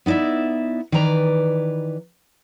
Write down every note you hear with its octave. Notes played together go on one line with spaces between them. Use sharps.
B3 D#4 E4 D5 E5
D#3 E3 B4 D5 A#5